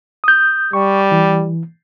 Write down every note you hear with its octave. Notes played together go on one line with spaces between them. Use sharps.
D#6 G6
G3 C#6
E3